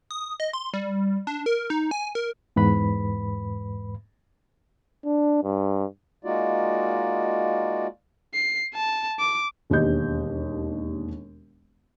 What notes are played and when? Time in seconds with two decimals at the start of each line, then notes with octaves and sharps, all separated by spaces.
0.11 D#6
0.40 D#5
0.53 C6
0.74 G3
1.27 D4
1.46 A#4
1.70 D#4
1.91 G#5
2.15 A#4
2.56 E2 G#2 B4 B5
5.05 D4
5.44 G2
6.24 G#3 A#3 D#4 F4 F#4 D5
8.34 C7
8.75 A5
9.20 D6
9.70 E1 D#2 D4 G4 D#5 G6